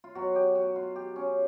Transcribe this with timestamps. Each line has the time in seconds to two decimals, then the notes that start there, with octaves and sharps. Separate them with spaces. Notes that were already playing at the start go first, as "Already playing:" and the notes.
0.04 F4
0.15 B2 F#3 F#4
0.35 G4
0.55 F#4
0.76 F4
0.96 G4
1.16 C#4